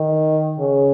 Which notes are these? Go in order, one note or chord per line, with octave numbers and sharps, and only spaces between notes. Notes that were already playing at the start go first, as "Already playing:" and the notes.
Already playing: D#3
C#3